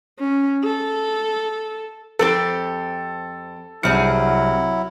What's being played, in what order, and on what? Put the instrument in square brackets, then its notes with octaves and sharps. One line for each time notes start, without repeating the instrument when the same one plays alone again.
[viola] C#4
A4
[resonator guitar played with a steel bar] F2 C4 G4 [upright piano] A4
[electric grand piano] C2 F6 C#7 [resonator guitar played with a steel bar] G2 C4 G#4 [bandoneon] F#3 E4